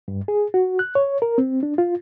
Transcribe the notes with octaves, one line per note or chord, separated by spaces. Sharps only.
G2
G#4
F#4
F#6
C#5
A#4
C4
D4
F4